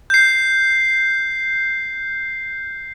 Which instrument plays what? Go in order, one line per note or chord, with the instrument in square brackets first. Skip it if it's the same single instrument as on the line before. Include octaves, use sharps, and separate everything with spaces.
[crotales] G6 C7